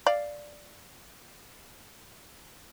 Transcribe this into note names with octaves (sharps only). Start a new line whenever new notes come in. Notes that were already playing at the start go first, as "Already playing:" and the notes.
D5 F5